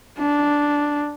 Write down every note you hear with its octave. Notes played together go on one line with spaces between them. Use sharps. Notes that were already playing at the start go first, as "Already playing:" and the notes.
D4